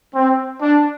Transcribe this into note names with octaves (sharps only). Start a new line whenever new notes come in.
C4
D4